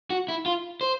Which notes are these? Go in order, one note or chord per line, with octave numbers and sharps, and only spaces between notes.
F#4
E4
F4
C5